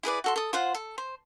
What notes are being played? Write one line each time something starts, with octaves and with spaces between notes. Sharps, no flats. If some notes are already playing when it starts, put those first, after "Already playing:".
E4 G#4 B4 D5
F#4 A4 C6
A4 D#6
F4 C5 F#5
A4
C5